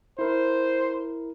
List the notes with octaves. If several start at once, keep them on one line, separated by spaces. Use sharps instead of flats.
E4 A#4 C5